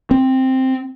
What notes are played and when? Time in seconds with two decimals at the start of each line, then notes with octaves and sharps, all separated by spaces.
0.11 C4